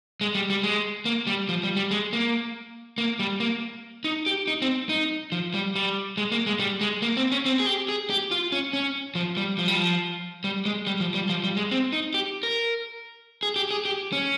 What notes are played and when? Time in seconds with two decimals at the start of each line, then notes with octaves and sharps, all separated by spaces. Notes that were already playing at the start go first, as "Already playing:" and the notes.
0.21 G#3
0.35 G3
0.50 G3
0.63 G#3
1.05 A#3
1.27 G3
1.49 F3
1.63 G3
1.76 G3
1.91 G#3
2.13 A#3
2.98 A#3
3.19 G3
3.40 A#3
4.04 D#4
4.26 G4
4.48 D#4
4.62 C4
4.89 D#4
5.32 F3
5.54 G3
5.75 G3
6.17 G#3
6.32 A#3
6.47 G#3
6.60 G3
6.81 G#3
7.02 A#3
7.17 C4
7.32 C#4
7.46 C4
7.60 G#4
7.66 G4
7.89 G#4
8.10 G4
8.31 F4
8.52 C#4
8.73 C#4
9.15 F3
9.37 G3
9.58 F3
9.68 G3
9.76 F3
10.44 G3
10.65 G#3
10.87 G3
11.00 F3
11.14 G3
11.29 F3
11.44 G3
11.57 G#3
11.71 C4
11.93 D#4
12.14 G4
12.43 A#4
13.43 G#4
13.56 G4
13.71 G#4
13.85 G4
14.12 C#4